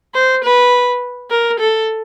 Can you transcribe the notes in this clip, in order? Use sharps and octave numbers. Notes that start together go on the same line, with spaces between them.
C5
B4
A#4
A4